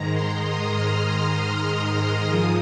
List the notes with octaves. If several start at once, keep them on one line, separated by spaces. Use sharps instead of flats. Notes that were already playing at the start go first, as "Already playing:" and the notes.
Already playing: G#2 D#3 G#3 A#5
C6
D#6
F6
G#2 F3 G#3 D#6